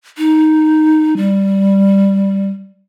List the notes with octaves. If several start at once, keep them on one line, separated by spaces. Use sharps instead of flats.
D#4
G3